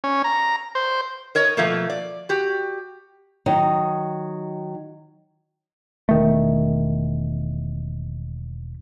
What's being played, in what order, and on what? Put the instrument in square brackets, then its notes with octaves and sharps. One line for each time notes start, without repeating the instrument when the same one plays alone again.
[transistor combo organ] C#4
A#5
C5
[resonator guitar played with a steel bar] A#4 C#5 D#5
B2 F3 A3 A#3
D5
F#4 G4
[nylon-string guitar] D#3 F#3 D#4 D#5
[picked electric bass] E1 D#3 A3